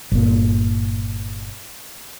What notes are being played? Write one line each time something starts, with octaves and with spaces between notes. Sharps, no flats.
G1 A#2